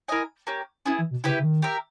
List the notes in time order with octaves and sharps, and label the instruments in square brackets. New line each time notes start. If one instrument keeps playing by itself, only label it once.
[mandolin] E4 A#4 D#5 G#5
A#3 C#4 G4
[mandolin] B3 E4 G#4 [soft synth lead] C#4
[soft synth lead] E3
B2
[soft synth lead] C#3 [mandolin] E4 G4 B4
[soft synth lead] C#3
D#3
[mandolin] G4 A#4 E5